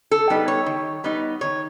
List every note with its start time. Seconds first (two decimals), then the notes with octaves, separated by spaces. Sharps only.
0.11 A4
0.30 G3 B3 D#4
0.48 C#5
0.66 D#3
1.04 G3 B3 D#4
1.41 D#3 C#5